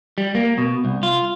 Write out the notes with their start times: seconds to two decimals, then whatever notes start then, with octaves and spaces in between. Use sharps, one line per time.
0.18 G3
0.35 A#3
0.58 B2
0.85 C2
1.03 F4